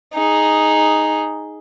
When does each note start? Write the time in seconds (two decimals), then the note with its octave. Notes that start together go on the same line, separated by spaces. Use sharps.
0.14 D#4 G#4